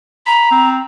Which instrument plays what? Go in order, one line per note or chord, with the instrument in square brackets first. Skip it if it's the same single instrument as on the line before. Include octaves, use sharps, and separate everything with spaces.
[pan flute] A#5 [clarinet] B5
[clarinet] C4